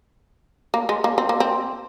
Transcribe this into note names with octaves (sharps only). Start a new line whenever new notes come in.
A#3
G#3
A#3
C4
A#3
C4